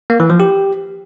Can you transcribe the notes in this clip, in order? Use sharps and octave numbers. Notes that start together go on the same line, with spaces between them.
A#3
E3
F3
G4